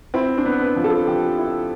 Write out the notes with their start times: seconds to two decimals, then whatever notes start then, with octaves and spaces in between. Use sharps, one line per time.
0.14 C4 E4
0.38 D4
0.45 B3
0.60 B4
0.76 F3
0.84 A4
1.07 F3 G4
1.38 E4